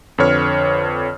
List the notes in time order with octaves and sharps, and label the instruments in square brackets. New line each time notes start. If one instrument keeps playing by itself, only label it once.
[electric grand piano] F2 D3 B4 C#5 F6